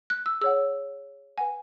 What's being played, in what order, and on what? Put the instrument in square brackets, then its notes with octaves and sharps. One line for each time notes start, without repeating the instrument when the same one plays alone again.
[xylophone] F#6
E6
G#4 C#5 F#5 E6
B4 F#5 G#5